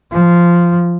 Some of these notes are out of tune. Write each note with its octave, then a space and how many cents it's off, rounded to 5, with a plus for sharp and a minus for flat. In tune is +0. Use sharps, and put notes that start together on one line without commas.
F3 -10